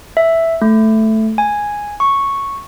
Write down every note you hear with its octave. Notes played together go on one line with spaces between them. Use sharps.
E5
A3
G#5
C#6